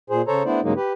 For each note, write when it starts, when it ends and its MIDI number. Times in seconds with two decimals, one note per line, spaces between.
0.10 0.22 46
0.10 0.22 68
0.10 0.22 72
0.28 0.43 49
0.28 0.43 69
0.28 0.43 72
0.28 0.43 73
0.28 0.43 82
0.45 0.61 57
0.45 0.61 59
0.45 0.61 62
0.45 0.61 64
0.45 0.61 72
0.45 0.61 74
0.63 0.73 43
0.63 0.73 49
0.63 0.73 54
0.63 0.73 56
0.63 0.73 58
0.63 0.73 63
0.76 0.93 67
0.76 0.93 71